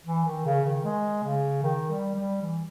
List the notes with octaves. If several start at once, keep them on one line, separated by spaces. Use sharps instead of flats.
E3
D#3
C#3
D#3
G#3
C#3
D#3
G3
G3
E3